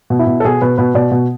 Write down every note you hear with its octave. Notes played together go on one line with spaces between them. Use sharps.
B2
E4
B2
A4
B2 G#4
B2 B4
B2 B4
B2 D5
B2